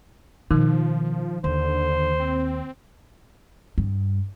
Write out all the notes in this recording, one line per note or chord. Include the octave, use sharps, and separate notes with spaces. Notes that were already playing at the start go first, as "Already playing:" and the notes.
B2 D#3 F3
D#2 D3 C5
C4
G2